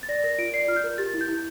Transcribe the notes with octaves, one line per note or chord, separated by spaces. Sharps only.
A6
D5 A#6
A#4 A#6
F4 D7
D5 C7
F4 F6
G6
A#4
G4 A6
E4
G6
E4